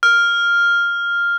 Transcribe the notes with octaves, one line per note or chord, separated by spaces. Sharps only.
F6